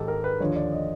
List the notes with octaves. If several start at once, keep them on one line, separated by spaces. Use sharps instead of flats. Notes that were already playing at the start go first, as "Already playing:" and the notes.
Already playing: G#2 D#3 G4 A4
A#4
B4
D#2 D3 F3 C#5
D5
D#5